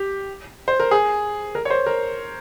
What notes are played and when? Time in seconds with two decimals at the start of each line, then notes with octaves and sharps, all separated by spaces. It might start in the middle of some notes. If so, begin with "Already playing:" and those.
Already playing: G4
0.68 C5
0.80 A#4
0.91 G#4
1.55 A#4
1.65 C#5
1.70 C5
1.86 A#4